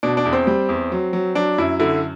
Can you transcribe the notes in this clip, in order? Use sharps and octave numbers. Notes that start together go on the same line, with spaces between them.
B2 D4
D4
E2
C4
G3
E2
F#3
F#3
F#3 D4
F#2 E4
D3 E4